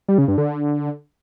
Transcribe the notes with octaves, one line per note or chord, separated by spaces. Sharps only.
G3
C#3
G2
D3